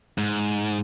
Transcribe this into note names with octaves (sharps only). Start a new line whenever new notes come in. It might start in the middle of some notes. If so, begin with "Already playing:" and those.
G#2